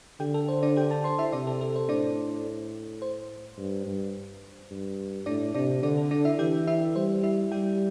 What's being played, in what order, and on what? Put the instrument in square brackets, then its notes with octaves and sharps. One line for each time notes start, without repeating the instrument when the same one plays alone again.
[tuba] D3 [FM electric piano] G4 G5
[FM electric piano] A4
C5
D4 D5
G4 G5
A4 A5
C5 C6
E4 E5
[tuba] C3 [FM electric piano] D4 D5
[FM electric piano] A4
A4
C5
[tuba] A2 [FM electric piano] D4 D5
[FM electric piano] C5
[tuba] G2
G2
G2
[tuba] A2 [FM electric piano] D4 D5
[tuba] C3 [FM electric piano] D4 D5
[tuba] D3 [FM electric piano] D4 D5
[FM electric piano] A4
D4 D5
E4 E5
[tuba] E3 [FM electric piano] G4 G5
[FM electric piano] E4 E5
[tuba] G3 [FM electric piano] C5
[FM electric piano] E4 E5
[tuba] G3 [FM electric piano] G4 G5